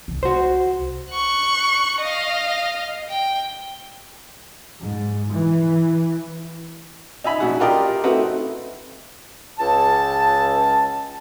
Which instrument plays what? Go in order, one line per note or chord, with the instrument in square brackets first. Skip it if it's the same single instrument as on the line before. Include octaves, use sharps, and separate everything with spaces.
[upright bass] C2
[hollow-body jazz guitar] F#4 C5
[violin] C#6 F#6
D#5 F5
G5
[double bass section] G#2
E3
[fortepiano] D#4 E5 G#5 B5
A#1 F#4
F4 G4 A#4 D5 D#5
A3 C4 D#4 E4 F#4 B4
[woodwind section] C#2 A5